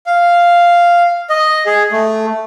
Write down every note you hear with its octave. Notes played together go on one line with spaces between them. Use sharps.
F5
D#5
G#4
A3